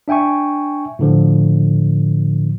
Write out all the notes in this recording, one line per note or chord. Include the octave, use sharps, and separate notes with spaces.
D4 E5 G5 G#5 C#6
A2 D3 F3